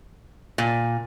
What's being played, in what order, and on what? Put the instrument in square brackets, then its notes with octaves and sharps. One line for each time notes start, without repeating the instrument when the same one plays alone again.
[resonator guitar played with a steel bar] A#2